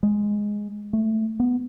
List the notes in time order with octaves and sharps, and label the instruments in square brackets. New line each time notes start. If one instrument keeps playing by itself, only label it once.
[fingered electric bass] G#3
A3
B3